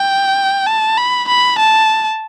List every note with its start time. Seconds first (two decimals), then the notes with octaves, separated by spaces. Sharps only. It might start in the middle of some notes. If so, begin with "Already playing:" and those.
Already playing: G5
0.67 A5
0.98 B5
1.28 B5
1.59 A5